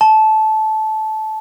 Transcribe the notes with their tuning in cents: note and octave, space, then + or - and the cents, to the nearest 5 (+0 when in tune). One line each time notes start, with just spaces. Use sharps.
A5 -15